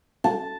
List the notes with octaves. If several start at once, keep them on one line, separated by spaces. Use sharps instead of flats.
A5